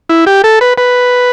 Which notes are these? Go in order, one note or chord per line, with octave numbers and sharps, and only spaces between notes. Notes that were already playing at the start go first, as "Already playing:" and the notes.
E4
G4
A4
B4
B4